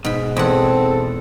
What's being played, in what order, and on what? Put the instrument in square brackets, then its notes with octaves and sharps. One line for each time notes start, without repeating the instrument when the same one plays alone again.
[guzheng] G#2 B5 [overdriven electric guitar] B2
[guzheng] E2 F#5 [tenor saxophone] C4 [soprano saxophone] A4